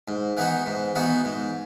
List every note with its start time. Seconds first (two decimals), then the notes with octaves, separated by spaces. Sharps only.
0.08 G#2
0.37 E3 B3 D#4 F#4
0.66 G#2
0.95 E3 B3 D#4 F#4
1.25 G#2